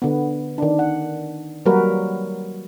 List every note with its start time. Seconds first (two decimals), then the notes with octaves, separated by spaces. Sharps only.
0.02 D3 B3
0.58 D#3 D4
0.79 F#5
1.66 F#3 G3 A#3 F#4 A#4 B4